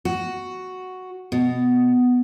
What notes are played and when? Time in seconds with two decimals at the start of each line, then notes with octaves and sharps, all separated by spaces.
0.05 F#4
1.32 B2